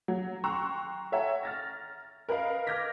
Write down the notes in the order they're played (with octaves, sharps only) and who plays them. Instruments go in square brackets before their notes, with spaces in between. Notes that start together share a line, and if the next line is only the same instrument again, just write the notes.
[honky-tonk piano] F#3
G5 A#5 C6 C#6 E6 F#6
A4 C#5 E5 F#5 G5 A#5
F6 A6 A#6
A#4 B4 D#5 F5 B5
D6 F6 G6 G#6 A#6 B6